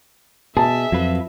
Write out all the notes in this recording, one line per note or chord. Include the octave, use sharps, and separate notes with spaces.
B2 G#4 E5 A5
F2 F#3 F4 B4